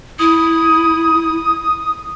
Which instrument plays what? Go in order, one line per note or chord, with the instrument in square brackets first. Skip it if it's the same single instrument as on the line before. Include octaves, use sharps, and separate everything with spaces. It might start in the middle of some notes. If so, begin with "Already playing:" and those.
[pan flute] E4 [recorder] D#6